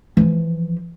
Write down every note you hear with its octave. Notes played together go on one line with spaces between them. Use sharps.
E3 F3